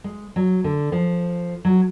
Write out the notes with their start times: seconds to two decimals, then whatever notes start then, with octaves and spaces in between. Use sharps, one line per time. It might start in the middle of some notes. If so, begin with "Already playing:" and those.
0.04 G#3
0.36 F#3
0.64 D3
0.92 F3
1.65 F#3